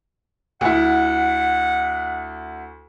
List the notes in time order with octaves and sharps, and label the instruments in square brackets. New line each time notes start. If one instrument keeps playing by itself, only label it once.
[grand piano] D2 E4 [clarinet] F#5